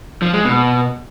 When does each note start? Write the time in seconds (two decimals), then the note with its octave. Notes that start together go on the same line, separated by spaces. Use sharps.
0.22 F3
0.33 G#3
0.45 B2